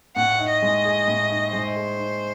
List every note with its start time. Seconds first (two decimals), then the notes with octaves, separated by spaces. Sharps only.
0.16 A2 F#5
0.39 D#4
0.50 D#5
0.62 G#3
0.85 G#4
1.08 A2
1.30 D#4
1.53 G#3 C5
1.76 G#4
1.98 D#4